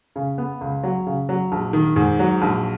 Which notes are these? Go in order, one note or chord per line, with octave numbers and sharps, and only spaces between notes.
C#3
B3
C#2
F#3
C#3
F#3
A#1
D#3
G#2
F#3
A#1